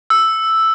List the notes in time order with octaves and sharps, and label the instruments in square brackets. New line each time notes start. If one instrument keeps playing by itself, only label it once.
[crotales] E6